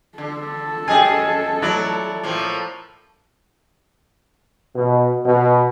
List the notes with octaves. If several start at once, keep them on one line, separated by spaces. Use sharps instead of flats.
D3 A4
F#2 G4 G#4 D#5 G#5
F#3 E4 D5
A2 F3 A#3
B2
B2